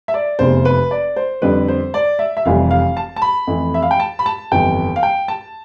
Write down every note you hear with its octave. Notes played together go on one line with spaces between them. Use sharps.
E5
D5
F1 E2 C3 C5
B4
D5
C5
F2 D3 G3 B4
C5
D5
E5
E5
F1 F2 E3 G3 F5
F5
A5
A5
B5
F2 E3 A3
E5
F5
G5
A5
B5
A5
G1 F2 E3 G5
F5
G5
A5